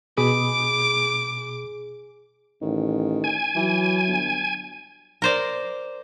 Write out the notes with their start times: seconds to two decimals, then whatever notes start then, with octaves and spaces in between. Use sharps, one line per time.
0.18 B2 G#4 B5 D6 D#6
2.62 A1 D#3
3.24 G#5
3.56 E3 F#3
4.08 G1
5.22 A#4 C5 D5